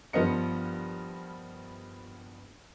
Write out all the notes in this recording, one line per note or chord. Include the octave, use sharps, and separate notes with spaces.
G2 F3 B3 A#4 D#5 C#7